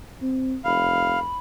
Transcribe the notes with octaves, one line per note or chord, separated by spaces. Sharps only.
C4
F1 F5 B5